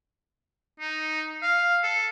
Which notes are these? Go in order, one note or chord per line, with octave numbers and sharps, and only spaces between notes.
D#4
F5
A4